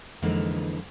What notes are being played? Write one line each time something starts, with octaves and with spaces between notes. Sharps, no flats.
F2 D3 E3 G#3 A#3 D#4